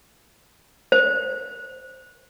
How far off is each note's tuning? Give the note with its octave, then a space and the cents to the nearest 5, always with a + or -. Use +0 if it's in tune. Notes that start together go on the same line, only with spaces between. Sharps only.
C5 -5